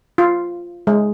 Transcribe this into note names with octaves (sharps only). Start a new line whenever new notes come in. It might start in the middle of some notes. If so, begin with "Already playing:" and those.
F4
G#3